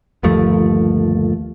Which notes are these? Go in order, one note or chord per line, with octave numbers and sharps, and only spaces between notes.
G1 D#2 F3 A3